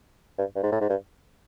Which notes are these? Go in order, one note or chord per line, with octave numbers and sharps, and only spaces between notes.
G2
G2
G#2
A2
G#2
G2